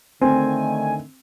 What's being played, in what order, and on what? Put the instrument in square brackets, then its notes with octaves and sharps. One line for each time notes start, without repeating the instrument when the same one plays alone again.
[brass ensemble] D3 D#3 A3 [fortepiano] C4 [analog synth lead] G#5